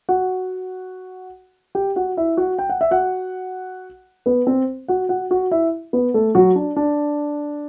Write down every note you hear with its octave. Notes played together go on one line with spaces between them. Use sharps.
F#4 F#5
G4 G5
F#4 F#5
E4 E5
F#4 F#5
G5
F#5
E5
F#4 F#5
B3 B4
C4 C5
F#4 F#5
F#4 F#5
F#4 F#5
E4 E5
B3 B4
A3 A4
F#3 F#4
D4
D4